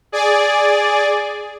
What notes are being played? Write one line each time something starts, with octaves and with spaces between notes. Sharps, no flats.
G#4 D5